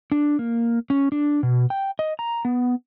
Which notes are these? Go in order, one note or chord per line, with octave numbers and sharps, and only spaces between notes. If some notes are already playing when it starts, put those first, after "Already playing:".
D4
A#3
C#4
D4
B2
G5
D#5
A#5
B3